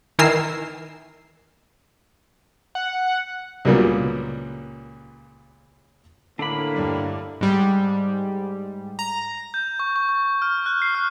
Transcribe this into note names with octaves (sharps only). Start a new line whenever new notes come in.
D#3 E3 A#4 G#5 E6 C7
F#5
C#2 A#2 F#3 G3 A#3 B3
A2 D3 A#3 D4 B5
G2 G3
G#2 G3
A#5
G6
C#6
C#6
C#6
F6
F#6
C7
F6